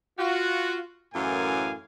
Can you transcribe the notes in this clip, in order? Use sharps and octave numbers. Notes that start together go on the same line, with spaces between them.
F4 F#4
F#2 A2 E3 A#4 F5 G#5